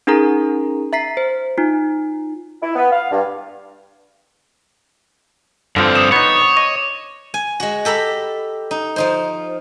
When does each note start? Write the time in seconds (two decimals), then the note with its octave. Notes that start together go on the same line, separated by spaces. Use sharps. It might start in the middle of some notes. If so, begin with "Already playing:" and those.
0.07 C#4 D#4 G#4 A#4 A#5
0.93 E5 A#5 B6 C7
1.17 C5
1.58 D#4 F4
2.62 E4
2.75 B3
2.91 F5
3.11 G2
5.76 G2 D3 F3 C4
5.96 D6 D#6 E7
6.12 B3 D#4 C#5
6.57 D#5 C#6
7.34 G#5
7.60 G#3 F#4
7.85 G4 A4 A#5 B5
8.71 D#4
8.96 F3 D#4 C5